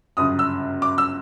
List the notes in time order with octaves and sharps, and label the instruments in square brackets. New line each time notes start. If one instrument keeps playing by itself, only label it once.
[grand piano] G1 F#2 C#3 D#6
E6
D6
E6